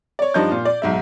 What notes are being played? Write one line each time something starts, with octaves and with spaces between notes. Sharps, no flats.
C#5 D5
G2 F3 D4 D#4 G6
A#2 F4
D5
B1 G#2 E5